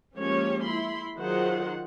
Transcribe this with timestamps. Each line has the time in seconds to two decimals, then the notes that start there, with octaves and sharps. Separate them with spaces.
0.16 F3 G#3 A#3 C#4 G4 C#5
0.64 E4 B5 C6
1.20 D#3 F#3 F4 G#4 C5 F#5